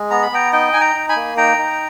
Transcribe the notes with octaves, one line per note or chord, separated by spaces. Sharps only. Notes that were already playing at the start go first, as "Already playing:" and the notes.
Already playing: G#3
B3 A#5
B5
B3 G5 A#5
D#4 D#5 G5
D#4 G#5
G5 A#5
D#4
G#5 B5
A#3
D#4 G5 A#5
D#4